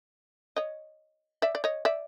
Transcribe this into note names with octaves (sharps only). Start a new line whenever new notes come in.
C#5 D#5
D5 E5
D5
C#5 D#5
D5 E5